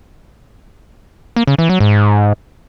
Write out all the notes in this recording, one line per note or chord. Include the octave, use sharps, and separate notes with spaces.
A#3
C#3
E3
F#3
G#2